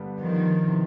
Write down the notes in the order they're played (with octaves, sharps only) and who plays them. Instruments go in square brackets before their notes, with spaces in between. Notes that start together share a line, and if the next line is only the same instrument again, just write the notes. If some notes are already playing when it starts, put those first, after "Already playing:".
Already playing: [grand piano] G2 D3 G3 B3 D4
[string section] D#3 F3
[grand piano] C3 E3